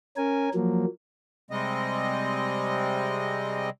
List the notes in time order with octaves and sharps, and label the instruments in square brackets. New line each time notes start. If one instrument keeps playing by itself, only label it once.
[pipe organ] C#4 A#4 G#5
F3 F#3 A#3
[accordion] C3 G3 G#3 C4 D#5